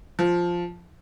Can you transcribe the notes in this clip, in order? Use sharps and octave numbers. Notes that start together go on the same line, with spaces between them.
F3